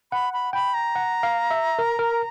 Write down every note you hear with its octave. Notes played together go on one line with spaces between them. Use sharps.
F#5 B5
B5
G5 B5
A#5
F#5
F5
E5
A#4
A#4